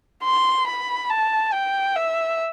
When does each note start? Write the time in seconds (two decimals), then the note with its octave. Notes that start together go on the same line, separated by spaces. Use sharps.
0.24 C6
0.67 B5
1.10 A5
1.53 G5
1.96 E5